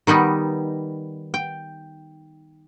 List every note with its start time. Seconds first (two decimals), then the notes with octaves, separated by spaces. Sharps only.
0.07 D#3 G3 B3 D#4
1.34 G5